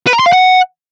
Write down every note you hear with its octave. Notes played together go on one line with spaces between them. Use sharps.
B4
A#5
C6
F5
F#5